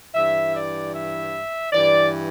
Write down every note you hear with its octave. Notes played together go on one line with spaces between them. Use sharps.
G2 E3 E5
D5
E5
G2 E3 D5